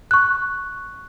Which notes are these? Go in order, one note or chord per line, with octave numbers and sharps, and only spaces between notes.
C#6 F#6